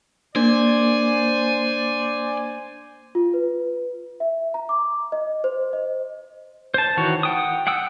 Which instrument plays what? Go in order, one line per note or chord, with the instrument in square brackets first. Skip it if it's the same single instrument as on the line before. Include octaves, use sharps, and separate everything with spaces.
[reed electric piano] A#3 [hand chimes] D4 [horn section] C5 D5 [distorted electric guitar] G#5
[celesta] F4
B4
E5
A#5
D6
D#5
C5
D#5
[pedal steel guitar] C5 A5
D#3 E3 F#4 C#5
F#5 G5 D#6
F#5 G5 D#6 E6